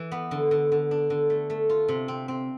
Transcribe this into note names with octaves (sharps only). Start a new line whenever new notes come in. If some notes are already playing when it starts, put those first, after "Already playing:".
Already playing: E3
B3
D3
D3
D3
D4
D3
A3
A3
F4
C3
C4
C4